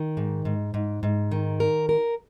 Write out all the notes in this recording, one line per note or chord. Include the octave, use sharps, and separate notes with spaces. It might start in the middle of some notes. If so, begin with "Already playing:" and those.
Already playing: D#3
G#2
G#2
G#2
G#2
D#3
A#4
A#4